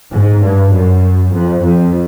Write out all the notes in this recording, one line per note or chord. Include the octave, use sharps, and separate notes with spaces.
G#2
G2
F#2
F2
F2